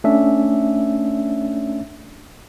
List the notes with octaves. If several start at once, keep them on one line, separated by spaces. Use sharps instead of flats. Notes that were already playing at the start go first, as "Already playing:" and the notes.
A3 C#4 D4 E5